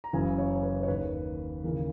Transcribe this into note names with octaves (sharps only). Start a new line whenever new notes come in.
A#5
F#1 F#2 C#3 E3 G#5
C#5
B4
C#5
D#2 D#3 B4
D#2 C#3 E3 A#4